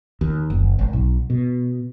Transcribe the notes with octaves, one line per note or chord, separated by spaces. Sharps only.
D#2
F#1
G#1
B1
B2